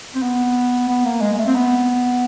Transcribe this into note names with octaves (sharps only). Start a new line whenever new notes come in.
C4
B3
B3
A#3
G#3
G#3
A3
C4
B3